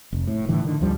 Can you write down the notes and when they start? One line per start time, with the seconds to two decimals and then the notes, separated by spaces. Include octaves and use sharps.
0.13 F1
0.27 A2
0.49 A2 D3 E3
0.64 D3 D#3
0.81 D2 G#2 F3 G3